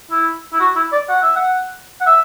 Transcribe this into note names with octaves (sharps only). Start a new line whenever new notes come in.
E4
E4
F#4
E4
D5
F#5
E5
F#5
F#5
E5